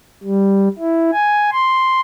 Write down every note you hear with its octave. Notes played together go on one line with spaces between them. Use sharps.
G3
E4
G#5
C6